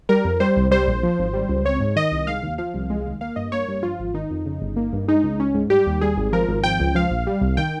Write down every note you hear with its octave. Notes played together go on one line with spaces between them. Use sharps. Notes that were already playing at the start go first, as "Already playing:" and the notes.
G3 A#4
F2
G3 C5
C2
G3 C5
A#1
F3
G#1
G3
C#2
C4 C#5
G#2
D#3 D#5
C2
G#3 F5
D#2
F3 F5
C2
G#3
D#2
A#3 F5
G2 D#5
A#3 C#5
G2
F3 F4
G#1
D#3 D#4
F2
C#3
G1
A#3
G2
G#3 D#4
C#2
C#4
G#2
G3 G4
D#2
G3 G#4
G#1
F3 A#4
G#1
F3 G5
C#2
F3 F5
A#1
G3
C2
D#3 G5